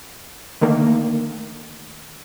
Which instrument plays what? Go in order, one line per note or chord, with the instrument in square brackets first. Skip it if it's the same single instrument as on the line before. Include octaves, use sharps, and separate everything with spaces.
[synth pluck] D3 D#3 A3 A#3